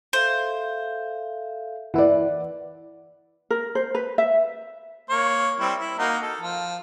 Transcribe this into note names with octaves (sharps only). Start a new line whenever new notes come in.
A4 C5 E5 F5
E3 E4 D5 F#5
A#4
C5
B4
E5
A#3 C#5
G3 C4 E4
E4
A#3 D#4 F#4
A4
F3